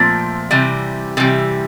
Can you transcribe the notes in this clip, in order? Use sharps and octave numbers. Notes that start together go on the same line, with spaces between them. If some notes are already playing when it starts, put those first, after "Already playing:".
Already playing: A#2 F3 A3 C4
C3 E3 G3
C3 E3 G3